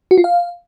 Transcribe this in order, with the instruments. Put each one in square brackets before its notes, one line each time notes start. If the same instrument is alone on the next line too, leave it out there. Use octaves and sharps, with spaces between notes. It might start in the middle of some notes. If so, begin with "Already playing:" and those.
[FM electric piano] F#4
F4
F5